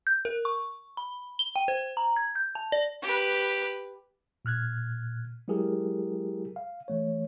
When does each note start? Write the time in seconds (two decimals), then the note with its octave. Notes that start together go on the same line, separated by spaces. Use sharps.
0.07 G6
0.25 A#4
0.45 C#6
0.97 B5
1.39 G7
1.56 G5
1.68 C5
1.97 A#5
2.17 G#6
2.36 G6
2.55 A5
2.72 D5
3.02 G4 B4
4.45 A#2 F6 F#6 G#6
5.48 F#3 G#3 E4 G4 G#4 A#4
6.56 F5
6.88 E3 A3 C#5